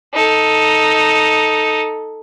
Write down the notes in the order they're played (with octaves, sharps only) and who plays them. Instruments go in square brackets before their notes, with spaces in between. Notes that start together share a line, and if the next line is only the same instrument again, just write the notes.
[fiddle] D#4 A4